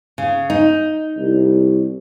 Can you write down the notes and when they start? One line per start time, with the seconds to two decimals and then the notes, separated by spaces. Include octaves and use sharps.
0.18 C#3
0.50 D#4
1.17 C2